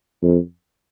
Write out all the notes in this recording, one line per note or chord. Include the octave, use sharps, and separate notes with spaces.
F2